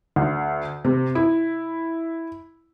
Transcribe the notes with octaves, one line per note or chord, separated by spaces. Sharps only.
D2
C3
E4